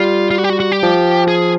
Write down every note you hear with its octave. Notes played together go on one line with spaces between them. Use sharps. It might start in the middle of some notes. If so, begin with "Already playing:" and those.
Already playing: G3 F4
F4
F#4
G4
F#4
F#4
G4
F3
G#4